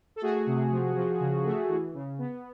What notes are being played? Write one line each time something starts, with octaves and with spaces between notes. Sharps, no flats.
A4
A3 F#4 G#4
C3
F3
F3
C#3
A3
E3
C#3
B3